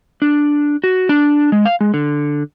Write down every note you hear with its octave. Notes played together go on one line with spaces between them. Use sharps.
D4
F#4
D4
G#3
F5
G#3
D3